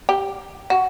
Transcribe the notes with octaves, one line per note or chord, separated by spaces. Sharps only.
G4
F#4